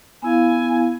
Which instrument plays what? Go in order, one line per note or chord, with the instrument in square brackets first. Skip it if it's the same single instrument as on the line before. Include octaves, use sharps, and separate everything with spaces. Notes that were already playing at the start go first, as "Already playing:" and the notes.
[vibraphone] B3 E4 F5 [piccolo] G#5